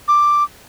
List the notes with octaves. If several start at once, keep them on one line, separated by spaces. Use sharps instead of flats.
D6